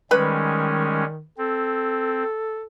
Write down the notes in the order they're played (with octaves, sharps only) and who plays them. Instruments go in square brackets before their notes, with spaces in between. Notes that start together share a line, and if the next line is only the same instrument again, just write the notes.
[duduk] D#3 [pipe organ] G3 G#3 C#4 [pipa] B4 B5
[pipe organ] C4 [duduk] A4